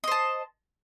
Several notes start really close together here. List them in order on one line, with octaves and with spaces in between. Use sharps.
D#5 C5 A5